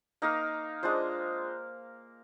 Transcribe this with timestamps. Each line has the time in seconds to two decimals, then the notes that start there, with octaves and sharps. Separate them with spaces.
0.22 A#3 D#4 A#4 F5
0.83 G#3 D4 F4 C5